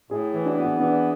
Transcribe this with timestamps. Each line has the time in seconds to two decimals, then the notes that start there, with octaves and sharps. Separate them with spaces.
0.10 A2 E4 G#4
0.34 E3
0.46 D4 F#4
0.57 B3
0.80 E3 D4